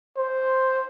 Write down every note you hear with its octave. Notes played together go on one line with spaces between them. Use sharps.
C5